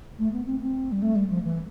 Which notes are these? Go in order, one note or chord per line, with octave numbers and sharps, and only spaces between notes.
A3
B3
C4
C4
G3
A3
G3
F3
E3